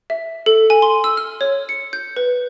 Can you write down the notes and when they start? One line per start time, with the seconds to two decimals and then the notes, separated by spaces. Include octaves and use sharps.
0.10 E5
0.46 A4
0.70 G#5
0.82 C6
1.04 E6
1.17 F6
1.41 C#5
1.69 C#7
1.93 G6
2.16 B4